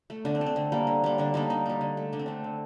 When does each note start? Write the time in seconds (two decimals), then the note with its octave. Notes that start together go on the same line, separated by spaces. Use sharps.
0.10 A3
0.25 D3 D4
0.35 C4
0.41 A3
0.46 C4
0.56 D3
0.72 G3 A#3
0.87 D3
1.04 G3 A#3
1.18 D3 D4
1.34 G3 A#3 D#4
1.50 D3 D#4
1.66 G3 A#3
1.81 D3
1.97 A3
2.13 D3 D4
2.19 C4
2.26 A3 D4
2.44 D3